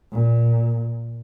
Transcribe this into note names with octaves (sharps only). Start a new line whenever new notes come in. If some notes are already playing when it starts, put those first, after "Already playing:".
A#2